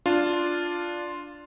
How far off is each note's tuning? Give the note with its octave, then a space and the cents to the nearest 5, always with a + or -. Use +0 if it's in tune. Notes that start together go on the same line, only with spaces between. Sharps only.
D4 +0 F4 +0